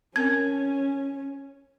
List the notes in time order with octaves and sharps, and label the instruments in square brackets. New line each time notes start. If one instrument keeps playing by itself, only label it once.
[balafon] C4 A#4 G#5 [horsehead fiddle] C#4 [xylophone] G#6